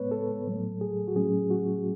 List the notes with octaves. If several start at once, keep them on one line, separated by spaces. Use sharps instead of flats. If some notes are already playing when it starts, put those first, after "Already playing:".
Already playing: A2 G#3 B3 B4 C#5
A4
A2 F#3 A3
G#4
F#4
A2 F#3 A3 C#4 G#4
F#4